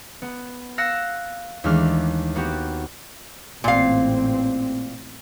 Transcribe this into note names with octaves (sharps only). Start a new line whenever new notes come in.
B3
F5 E6 F#6 A#6 C#7 E7
D#2 E3 G#3 A3 D4 F6
A#3 B3 F#4 G4
A1 A#2 C4 F5